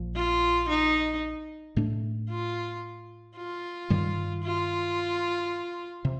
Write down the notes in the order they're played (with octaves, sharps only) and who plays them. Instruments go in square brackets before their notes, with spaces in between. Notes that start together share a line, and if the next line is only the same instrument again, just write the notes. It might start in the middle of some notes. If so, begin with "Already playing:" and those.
Already playing: [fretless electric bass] A#1 A#2 F3
[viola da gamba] F4
D#4
[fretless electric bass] A2 A3 D4
[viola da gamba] F4
F4
[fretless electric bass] G2 D#3 G3
[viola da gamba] F4
[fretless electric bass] C3